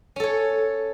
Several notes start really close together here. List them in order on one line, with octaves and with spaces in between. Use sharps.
C#4 A4 C#5